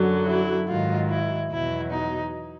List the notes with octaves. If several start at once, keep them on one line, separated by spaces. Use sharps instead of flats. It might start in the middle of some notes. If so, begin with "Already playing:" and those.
Already playing: F#2 D3 F#3
E4
G#2 D#3 F#3 F4
E4
E2 B2 F#3 E4
D#4